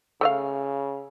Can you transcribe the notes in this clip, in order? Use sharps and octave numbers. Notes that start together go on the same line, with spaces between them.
C#3 A3 D#5 F5